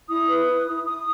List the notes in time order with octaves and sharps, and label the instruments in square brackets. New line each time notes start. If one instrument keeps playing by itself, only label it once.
[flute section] E4 D#6
B4
E4
E4
E4 D#6